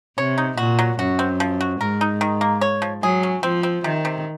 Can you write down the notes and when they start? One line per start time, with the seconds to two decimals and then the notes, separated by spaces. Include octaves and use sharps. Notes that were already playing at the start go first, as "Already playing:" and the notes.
0.18 C3 C#5
0.38 D#4
0.57 A#2 F#4
0.79 F#3
0.99 F#2 F#4
1.19 C4
1.40 F3
1.61 F#4
1.80 G#2 A#4
2.01 D#4
2.21 D#3
2.41 A#3
2.61 C#5
2.82 F3
3.02 F#3 G#4
3.23 C#4
3.43 F3 C4
3.63 C4
3.84 C3 D#3
4.05 C3